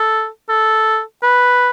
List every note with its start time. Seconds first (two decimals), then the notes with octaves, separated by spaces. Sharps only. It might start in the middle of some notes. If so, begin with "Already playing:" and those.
Already playing: A4
0.49 A4
1.23 B4